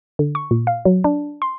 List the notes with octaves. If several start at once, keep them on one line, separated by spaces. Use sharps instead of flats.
D3
C#6
A#2
F5
F#3
D4
C6